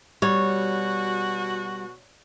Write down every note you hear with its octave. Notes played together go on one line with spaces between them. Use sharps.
B2 G3 F#4 C#5